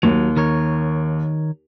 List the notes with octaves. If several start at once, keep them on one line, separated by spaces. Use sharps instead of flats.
D#2 F#3
D#3 A#4 C#5